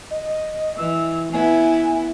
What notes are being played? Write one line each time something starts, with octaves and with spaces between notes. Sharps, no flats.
D#5
E3 E6
B3 E4 G#5